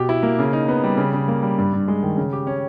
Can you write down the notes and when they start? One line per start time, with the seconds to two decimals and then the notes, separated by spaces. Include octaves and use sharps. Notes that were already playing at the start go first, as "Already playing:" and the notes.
Already playing: B2 G4
0.09 E4
0.23 A#3
0.39 C#3
0.53 D#4
0.68 B3
0.84 G3
0.97 C#3
1.13 C#3
1.28 A#3
1.43 G3
1.58 G2
1.73 G2
1.88 G#3
2.03 D#3
2.17 C#3
2.33 G4
2.47 C#4